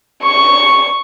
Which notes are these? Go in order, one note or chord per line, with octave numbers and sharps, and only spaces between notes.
C#6